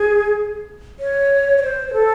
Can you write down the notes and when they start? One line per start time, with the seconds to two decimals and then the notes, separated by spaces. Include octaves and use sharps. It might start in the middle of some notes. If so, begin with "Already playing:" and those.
Already playing: G#4
0.99 C#5
1.58 C#5
1.63 C5
1.88 C5
1.93 A4